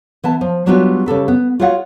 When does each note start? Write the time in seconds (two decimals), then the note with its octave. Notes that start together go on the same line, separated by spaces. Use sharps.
0.24 E3 B3 A5
0.41 F3
0.66 F#3 G3 B3 D4 F4 F#4
1.06 C#3 G4 A4 B4
1.28 B3
1.60 F4 F#4 G#4 C#5 F5 F#5